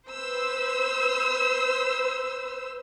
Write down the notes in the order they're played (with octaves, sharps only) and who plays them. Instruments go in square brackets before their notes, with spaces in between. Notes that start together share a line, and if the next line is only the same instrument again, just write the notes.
[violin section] B4 C5 E6